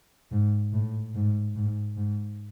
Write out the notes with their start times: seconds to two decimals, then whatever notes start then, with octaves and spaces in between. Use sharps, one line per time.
0.31 G#2
0.73 A2
1.15 G#2
1.56 G#2
1.96 G#2